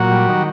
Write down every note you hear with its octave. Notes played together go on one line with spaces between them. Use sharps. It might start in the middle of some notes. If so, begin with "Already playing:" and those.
Already playing: A#2 F#3 F#4
G3
D#3